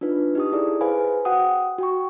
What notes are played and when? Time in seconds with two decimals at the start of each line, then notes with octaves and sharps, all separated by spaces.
0.01 D4 D#4 F4 B4
0.35 D#4 G4 D#6
0.52 E4 G#4 A4 D5
0.81 G#4 B4 C5 F5 G#5 B5
1.25 F#4 F#5 G5 D#6
1.79 F#4 G5 C#6